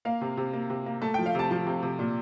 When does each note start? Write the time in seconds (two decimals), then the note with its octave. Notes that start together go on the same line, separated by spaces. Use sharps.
0.05 A#3 F5
0.21 C3
0.37 C3
0.53 A#3
0.70 C3
0.86 A#3
1.02 A3 A5
1.14 F3 G5
1.26 F5
1.35 C3 A5
1.51 F3 A5
1.67 C3
1.83 C3
1.99 A#2